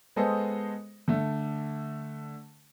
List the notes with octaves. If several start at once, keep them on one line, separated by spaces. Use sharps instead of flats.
G#3 B3 G#4 A4 C5 D#5
D3 A3